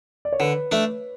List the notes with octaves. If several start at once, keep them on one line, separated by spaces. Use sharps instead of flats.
D5
C#5
D3 B4
A3 D4